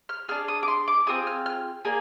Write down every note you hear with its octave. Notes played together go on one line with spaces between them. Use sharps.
F6
D4 G#4 F6
D#6
D6
C6
D6
C4 F4 G#4 D#6
F6
F6
A#3 D4 G#4